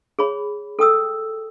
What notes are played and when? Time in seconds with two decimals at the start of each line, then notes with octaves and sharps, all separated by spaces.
0.19 G#4 C#5 B5
0.79 A4 G5 D#6 E6